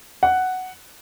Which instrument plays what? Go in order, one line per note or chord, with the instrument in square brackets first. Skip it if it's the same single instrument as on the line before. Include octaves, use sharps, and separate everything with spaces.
[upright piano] F#5